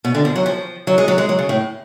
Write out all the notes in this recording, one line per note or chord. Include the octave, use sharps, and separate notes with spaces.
B2
D3
F3
F#3
F3
F#3
G#3
F#3
G#3
F#3
C#3
A2